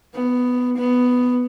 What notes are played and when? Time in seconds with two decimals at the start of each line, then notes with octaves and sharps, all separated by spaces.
0.14 B3
0.77 B3